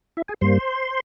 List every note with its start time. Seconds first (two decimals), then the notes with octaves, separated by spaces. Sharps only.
0.17 E4 E5
0.28 G#4 G#5
0.41 G2 G3 A#3 C5 C6